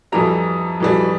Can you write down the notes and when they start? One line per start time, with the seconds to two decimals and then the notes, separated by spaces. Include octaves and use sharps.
0.12 F2 E3 G3 A#5
0.80 F2 E3 G3